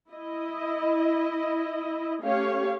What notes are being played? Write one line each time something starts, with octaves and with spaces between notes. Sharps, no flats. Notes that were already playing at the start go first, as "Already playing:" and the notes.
E4 D#5
A3 C#4 G4 C#5 F5